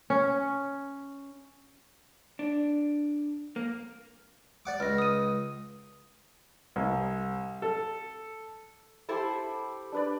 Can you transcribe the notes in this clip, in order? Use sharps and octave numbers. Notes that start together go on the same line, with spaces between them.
C#4
D4
A#3
D5 F#5 D6
C#2 F6 A#6
D#6 D#7
C2
A4
E4 G4 A4 C5 B5
D4 B4 D5